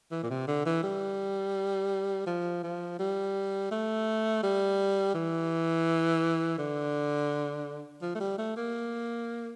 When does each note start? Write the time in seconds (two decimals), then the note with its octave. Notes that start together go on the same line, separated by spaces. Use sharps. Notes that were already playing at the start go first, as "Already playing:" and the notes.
0.12 E3
0.23 A#2
0.30 C3
0.48 D3
0.66 E3
0.83 G3
2.27 F3
2.64 F3
2.99 G3
3.71 A3
4.43 G3
5.15 E3
6.58 D3
8.02 F3
8.15 A3
8.20 G3
8.39 A3
8.56 A#3